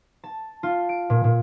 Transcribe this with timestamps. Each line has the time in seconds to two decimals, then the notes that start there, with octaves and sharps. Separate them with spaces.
0.24 A5
0.63 F4
0.89 D7
1.10 A#2
1.24 A#2